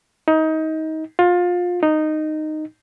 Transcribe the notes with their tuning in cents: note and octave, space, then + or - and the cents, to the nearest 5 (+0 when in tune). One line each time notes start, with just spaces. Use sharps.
D#4 +25
F4 +25
D#4 -10